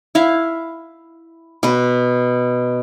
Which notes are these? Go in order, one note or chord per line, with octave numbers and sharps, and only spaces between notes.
E4 E5 F5
B2 B4